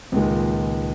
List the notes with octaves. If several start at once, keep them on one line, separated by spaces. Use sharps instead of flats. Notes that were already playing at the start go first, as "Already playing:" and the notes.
C#2 A#2 D#3 G#3